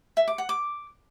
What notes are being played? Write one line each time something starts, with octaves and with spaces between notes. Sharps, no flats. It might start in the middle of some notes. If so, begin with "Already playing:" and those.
E5
D6
F#5
D6